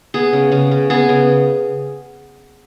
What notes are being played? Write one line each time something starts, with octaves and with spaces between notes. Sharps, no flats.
B3 G#4
C#3
C#3
C#3
B3 G#4
C#3